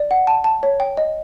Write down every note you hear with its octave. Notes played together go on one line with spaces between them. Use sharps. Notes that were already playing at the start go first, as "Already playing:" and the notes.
Already playing: D5
F#5
A5
A5
C#5
G5
D#5